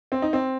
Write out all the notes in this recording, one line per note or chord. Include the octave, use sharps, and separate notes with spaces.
C4
D#4
C4